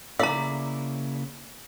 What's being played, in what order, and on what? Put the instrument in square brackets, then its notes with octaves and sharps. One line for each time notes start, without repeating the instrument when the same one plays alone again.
[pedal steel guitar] C#3 A#3 E4 [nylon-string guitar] D5 [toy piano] F5 A#5